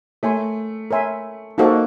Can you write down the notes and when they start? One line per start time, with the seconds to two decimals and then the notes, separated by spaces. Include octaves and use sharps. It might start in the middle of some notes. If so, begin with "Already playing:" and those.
0.23 A3 A#4 C#5 E5 G#5 C6
0.91 A#4 C#5 E5 G#5 C6
1.58 A#3 D#4 F#4 A4 C5